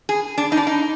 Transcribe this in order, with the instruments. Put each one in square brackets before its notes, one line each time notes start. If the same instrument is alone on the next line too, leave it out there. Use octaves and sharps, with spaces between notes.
[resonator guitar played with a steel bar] G#4
D4
D#4
D4
D#4